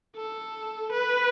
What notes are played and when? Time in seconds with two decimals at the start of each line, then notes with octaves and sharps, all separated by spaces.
0.16 A4
0.92 B4